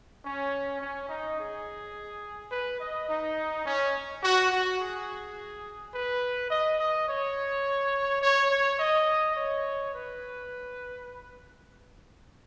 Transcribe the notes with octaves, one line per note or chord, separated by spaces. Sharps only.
C#4
C#4
D#4
G#4
B4
D#5
D#4
C#4
F#4
F#4
G#4
B4
D#5
D#5
C#5
C#5
C#5
D#5
C#5
B4